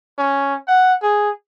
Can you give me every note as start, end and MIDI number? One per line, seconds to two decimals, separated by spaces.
0.18 0.55 61
0.68 0.94 78
1.03 1.30 68